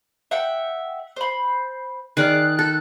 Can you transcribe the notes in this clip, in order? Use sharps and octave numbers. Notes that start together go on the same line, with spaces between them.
E5 F#5 G5
C5 B5
D#3 G#4 D5 D6 F6 F#6
A4